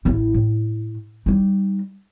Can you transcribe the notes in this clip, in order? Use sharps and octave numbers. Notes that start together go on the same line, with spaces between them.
A1 E4
A2
G3 D#4